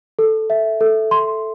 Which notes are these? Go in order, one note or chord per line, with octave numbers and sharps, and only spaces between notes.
A4
E5
A4
C6